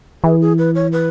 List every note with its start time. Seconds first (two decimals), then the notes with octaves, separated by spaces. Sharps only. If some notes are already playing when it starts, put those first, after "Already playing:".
0.23 E3 G#4
0.41 G#4
0.58 B4
0.75 C#5
0.92 B4